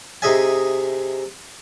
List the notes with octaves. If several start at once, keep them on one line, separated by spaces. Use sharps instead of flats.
C3 D#4 G#4 D#5 E5 G#5